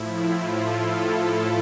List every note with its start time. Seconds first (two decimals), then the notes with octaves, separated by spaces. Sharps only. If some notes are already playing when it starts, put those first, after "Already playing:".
Already playing: A2 F3 E4
0.11 F4
0.52 A4